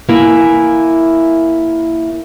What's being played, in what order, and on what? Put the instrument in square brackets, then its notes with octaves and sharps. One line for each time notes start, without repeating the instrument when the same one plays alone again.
[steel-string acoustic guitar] A#3 E4 E5 G#5